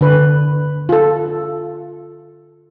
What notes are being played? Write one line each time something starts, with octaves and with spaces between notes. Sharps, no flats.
D3 B4
F4 A4